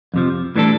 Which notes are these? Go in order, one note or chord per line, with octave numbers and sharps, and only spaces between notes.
F2 C3 F3
A2 E3 G3 D4 A4